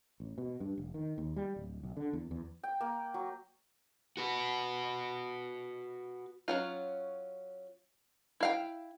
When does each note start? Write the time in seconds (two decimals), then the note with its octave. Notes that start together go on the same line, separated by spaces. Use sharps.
0.20 A1
0.38 B2
0.60 G2
0.78 F1
0.94 D#3
1.18 D#2
1.36 G3
1.56 D1
1.83 B1
1.97 D3
2.13 E2
2.31 E2
2.63 G5
2.80 A#3
3.14 F#3
4.17 F#4 B4
6.48 F#3 C#4 F4
8.40 E4 F5 G5